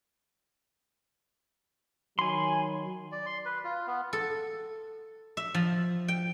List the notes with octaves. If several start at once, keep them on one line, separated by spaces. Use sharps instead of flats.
D#3 F#3 G#5 B5 C6
D5
C6
B4
F4
B3
A4
E5
F3
G5